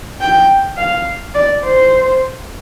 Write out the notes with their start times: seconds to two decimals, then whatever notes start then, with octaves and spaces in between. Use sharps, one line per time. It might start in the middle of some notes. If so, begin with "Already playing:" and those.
0.21 G5
0.77 F5
1.34 D5
1.64 C5